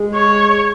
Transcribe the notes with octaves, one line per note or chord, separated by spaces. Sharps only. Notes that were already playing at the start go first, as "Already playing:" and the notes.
Already playing: G#3
C#5